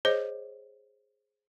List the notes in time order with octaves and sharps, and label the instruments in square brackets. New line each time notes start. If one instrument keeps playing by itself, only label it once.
[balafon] G#4 C5 C#5 D#5